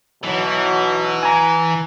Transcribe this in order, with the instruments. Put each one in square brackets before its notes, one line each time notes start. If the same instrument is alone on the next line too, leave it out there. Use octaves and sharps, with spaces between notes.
[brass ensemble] B1 B2 F#3 [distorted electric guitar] E3
[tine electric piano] G#5 A#5